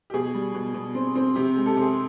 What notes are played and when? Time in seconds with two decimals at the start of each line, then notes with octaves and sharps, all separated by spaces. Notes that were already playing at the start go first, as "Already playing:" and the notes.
0.10 G4
0.14 B2 G#4
0.34 G3
0.55 B2
0.74 B2
0.95 C4
1.15 C4
1.35 C3 G4
1.56 G#3
1.66 G4 A4
1.77 C3 G#4